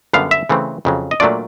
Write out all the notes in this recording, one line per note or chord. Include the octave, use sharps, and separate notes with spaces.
F#2 D3 G3 B3 F5
E5
C#3 E3 A3 C4
F2 C#3 F#3
D#5
A#2 F#3 A3 D4 F4 D5